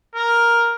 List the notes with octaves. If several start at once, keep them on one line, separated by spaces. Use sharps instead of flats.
A#4